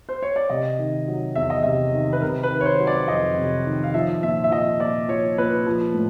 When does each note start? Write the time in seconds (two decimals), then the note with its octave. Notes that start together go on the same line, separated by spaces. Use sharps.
0.09 C5
0.23 C#5
0.36 D5
0.50 C3 D#5
0.79 D#3
1.08 F#3
1.35 E2 E5
1.50 D#5
1.63 C3 E5
1.93 D#3
2.13 B4
2.22 C3 A#4
2.43 B4
2.50 D#3
2.61 C#5
2.66 C5
2.80 F#3
2.87 D5
3.08 F2 D#5
3.37 C3
3.65 D#3
3.83 F5
3.94 F3 E5
4.23 A#2 E5
4.44 E5
4.51 F3 D#5
4.80 A#2 D5
5.08 F3 C#5
5.38 A#2 B4
5.66 F3
5.94 A2